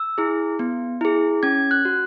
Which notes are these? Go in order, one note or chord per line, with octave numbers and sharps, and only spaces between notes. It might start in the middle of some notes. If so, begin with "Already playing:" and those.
Already playing: E6
E4 G#4
B3
E4 G#4
C#4 G#6
F#6
F#4